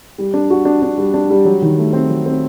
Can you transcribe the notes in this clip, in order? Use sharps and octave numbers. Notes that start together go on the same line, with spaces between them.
G3
D4
F#4
D4
D4
G3
D4
G3
F#3
D#3
A3
C4
F#3
C4